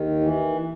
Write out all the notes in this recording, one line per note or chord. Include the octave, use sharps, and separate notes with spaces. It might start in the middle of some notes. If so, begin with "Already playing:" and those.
Already playing: D#2 D#3
E3